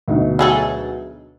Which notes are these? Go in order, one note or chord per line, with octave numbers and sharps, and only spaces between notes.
D2 B2 D#4
F#3 G#4 A4